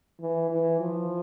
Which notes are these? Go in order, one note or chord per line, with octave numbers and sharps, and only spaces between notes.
E3
E3
F3